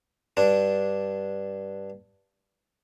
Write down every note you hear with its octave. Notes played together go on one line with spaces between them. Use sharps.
G2 D4